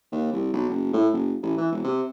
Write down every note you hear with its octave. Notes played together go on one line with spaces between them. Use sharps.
D#2
C2
B1
F#1
A2
F#1
A1
E3
E1
C3